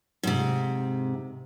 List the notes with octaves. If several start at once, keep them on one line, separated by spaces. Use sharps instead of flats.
G#2 C3